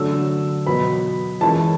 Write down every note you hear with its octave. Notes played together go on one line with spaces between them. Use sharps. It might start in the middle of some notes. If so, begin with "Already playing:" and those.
Already playing: D3 F#3 A3 D4 E6
B2 F#3 B3 B5
E3 G#3 C#4 E4 A5